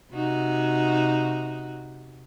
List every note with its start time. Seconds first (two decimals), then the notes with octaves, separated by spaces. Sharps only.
0.13 C3 D#4 F#4